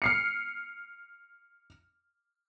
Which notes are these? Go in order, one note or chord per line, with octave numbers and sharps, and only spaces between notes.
F6 C7 C#7